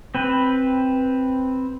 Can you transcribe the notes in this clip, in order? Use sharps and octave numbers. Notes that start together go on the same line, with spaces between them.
C4 B4